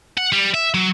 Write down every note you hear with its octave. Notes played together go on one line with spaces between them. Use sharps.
F#5
G3
E5
F#3